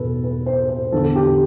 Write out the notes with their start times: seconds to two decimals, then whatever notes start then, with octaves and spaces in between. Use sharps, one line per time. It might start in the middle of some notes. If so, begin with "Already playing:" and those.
Already playing: E2 B2 A4 B4
0.24 B4
0.46 C5
0.69 C5
0.92 E2 D3 A4
1.15 G4